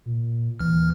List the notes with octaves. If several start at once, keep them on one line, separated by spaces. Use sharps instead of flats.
A#2
D#2 E3 F6